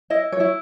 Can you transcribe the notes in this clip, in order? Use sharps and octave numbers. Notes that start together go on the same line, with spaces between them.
E4 D#5
C#5
E4